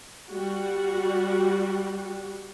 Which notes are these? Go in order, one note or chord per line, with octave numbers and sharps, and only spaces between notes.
G3 F#4